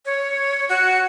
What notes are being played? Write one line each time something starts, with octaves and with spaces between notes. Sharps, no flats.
C#5
F#4